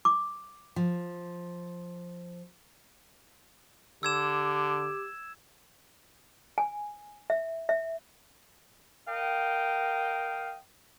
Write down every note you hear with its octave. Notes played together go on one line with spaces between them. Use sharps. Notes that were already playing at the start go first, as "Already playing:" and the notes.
D6
F3
D3 G4 E6 G#6 E7
G#5
E5
E5
A#4 D#5 F5 G5